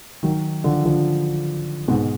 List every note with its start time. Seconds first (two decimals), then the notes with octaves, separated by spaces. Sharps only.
0.23 D#3 F#3
0.64 D3 F3
0.85 D3 F3
1.88 G#2 B2